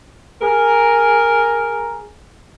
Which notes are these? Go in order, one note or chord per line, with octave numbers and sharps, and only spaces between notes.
G#4 A#4